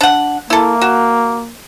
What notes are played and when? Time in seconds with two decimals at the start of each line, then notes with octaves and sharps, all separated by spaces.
0.01 D4 F#5
0.50 A#3 E4 A4
0.81 F#4